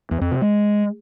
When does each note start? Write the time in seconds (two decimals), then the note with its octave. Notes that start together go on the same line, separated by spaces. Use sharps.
0.11 E2
0.21 F2
0.31 C3
0.42 G#3